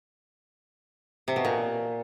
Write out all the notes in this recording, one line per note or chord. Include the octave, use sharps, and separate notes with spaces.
C3
B2
A#2